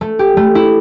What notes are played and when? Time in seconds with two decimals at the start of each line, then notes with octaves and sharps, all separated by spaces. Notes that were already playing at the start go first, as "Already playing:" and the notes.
0.01 A3
0.19 G4
0.37 A3
0.55 E4